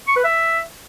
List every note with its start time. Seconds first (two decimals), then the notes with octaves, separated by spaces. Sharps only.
0.08 C#6
0.16 B4
0.24 E5